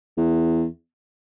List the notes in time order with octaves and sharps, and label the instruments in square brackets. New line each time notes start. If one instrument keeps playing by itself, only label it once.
[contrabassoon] E2